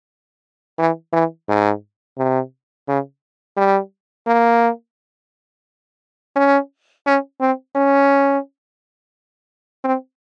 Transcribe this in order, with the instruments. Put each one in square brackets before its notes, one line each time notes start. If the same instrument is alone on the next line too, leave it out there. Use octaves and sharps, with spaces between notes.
[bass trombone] E3
E3
G#2
C3
C#3
G3
A#3
C#4
C#4
C4
C#4
C4